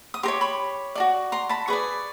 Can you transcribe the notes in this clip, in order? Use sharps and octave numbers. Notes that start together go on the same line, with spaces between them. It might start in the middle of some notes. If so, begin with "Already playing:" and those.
D#6
G4 A#4 C#5 C6 D6
B5 C#6
F#4 A4 D5
A#5 C6
A5 B5
G#4 B4 D5 C#6 D#6